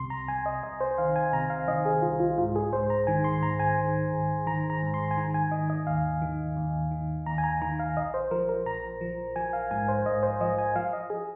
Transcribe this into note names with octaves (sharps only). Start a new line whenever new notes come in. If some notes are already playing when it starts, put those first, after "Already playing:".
Already playing: C2 C3 C6
A#5
C2 G#5
D#5
C2 D#5
C5
D#3 F5
G#5
C3 A#5
F5
D#3 D#5
G#4
C2 F4
F4
G#2 F4
G#4
G#2 C5
A#5
D#3 G#5
C6
G#1 A#5
G#5
D#3
G#1
D#3 A#5
A#5
G#2
C6
G#5
D#3 A#5
G#5
D#3 D#5
D#5
D#2 F5
D#3
D#2
D#3
D#2 A#5
G#5
A#5
D#3 A#5
F5
A#1 D#5
C5
F3 A#4
A#4
A#1 A#5
F3
F3 G#5
F5
G#2 G#5
C5
G#2 D#5
C5
F3 D#5
G#5
F3 F5
D#5
G#4